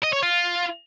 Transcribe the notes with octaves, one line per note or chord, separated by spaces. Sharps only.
D#5
C#5
F4